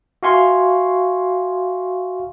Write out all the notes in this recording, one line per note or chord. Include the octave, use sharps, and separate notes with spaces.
F#4 E5 F5 G#5 C6 C#6